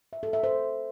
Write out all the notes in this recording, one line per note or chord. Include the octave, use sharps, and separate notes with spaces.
E5
A4
E5
C5